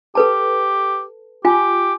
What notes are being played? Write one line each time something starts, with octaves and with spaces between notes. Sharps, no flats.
G4 A4 B4 A5
F4 G4 G#5